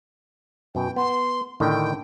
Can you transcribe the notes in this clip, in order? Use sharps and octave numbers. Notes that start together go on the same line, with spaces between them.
F#2 B2 G5
B3 C6
A2 D3 D#3 G5